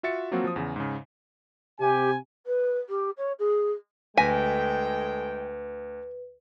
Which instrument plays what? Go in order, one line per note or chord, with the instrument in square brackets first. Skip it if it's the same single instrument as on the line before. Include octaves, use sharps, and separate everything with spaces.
[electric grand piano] F4 F#4 E5 A6 C#7
F3 F#3 A#3 C4 F4 F#4
F3 D#6
E2 C#3
G#2 C#3
[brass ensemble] C3 G#5 [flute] G4
[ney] B4
G4
C#5
G#4
[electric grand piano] D2 A#6 B6 [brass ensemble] G#3 A4 G5 [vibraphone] B4 [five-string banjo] G#5